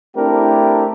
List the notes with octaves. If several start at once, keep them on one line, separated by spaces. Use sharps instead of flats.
A3 C4 D4 E4 G4 A#4